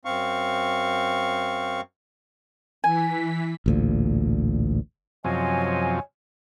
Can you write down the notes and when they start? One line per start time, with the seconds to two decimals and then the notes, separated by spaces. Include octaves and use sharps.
0.05 F#2 C4 F5 C#6
2.84 E3 G#5 B6
3.66 A1 D2 A#2
5.24 F#2 C3 F3 C#5 D#5 G#5